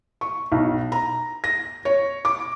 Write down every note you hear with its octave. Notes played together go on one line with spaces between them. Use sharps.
C#6
B1
A#5
A#6
C#5
D6